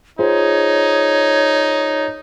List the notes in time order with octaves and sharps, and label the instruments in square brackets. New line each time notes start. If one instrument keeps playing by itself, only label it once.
[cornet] D#4 [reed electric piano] F4 G#4 C5 [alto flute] C#5